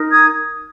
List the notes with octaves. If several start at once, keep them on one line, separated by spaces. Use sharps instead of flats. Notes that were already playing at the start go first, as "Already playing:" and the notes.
Already playing: D#4 A#4
D#6 G#6